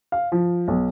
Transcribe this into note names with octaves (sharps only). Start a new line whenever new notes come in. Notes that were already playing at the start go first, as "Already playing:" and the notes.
F5
F3
B1